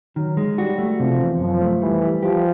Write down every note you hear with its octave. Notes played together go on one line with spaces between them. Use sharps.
D#3 F#3
G#3
G3 F#4
A3
C3 F3
E2
F#2 F3
A3
E3 G3
G3
F3 G4